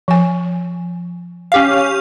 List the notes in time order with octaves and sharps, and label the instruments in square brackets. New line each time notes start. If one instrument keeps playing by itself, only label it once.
[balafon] F3 G#5
[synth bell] C#4 G4 F5